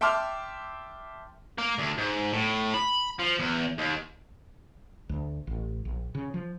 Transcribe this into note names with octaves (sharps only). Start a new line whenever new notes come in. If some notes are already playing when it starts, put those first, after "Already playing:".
E5 G5 A5 C6 D6 F6
A#3
D2
G#2
A2
B5
F3
E2
D#2
D2
A1
A#1
C#3
F3